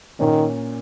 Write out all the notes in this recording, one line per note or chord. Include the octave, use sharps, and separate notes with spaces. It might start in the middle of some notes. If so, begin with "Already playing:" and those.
A#2 D#3 A#3 C#4